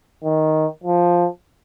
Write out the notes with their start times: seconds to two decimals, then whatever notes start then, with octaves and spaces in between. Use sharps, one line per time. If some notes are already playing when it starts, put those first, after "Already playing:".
0.24 D#3
0.84 F3